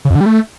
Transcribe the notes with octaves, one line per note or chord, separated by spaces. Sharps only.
C#3
F2
D3
G3
A3